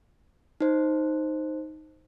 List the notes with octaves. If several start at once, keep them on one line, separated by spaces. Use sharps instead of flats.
D#4 C5